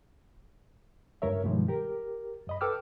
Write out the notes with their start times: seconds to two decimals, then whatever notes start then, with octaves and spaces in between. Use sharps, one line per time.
1.22 C#2 G2 A#4 C#5 E5
1.44 G2 B2 D#3 F3 G3 G#3
1.68 G4 A#4
2.47 F#2 D#5 B5
2.61 A4 B4 G5 D6 E6 F6